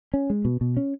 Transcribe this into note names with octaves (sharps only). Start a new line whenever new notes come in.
C#4
G#3
B2
B2
C#4